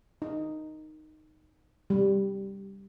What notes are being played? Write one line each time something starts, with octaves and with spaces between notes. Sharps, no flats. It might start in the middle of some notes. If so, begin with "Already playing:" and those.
D#4
G3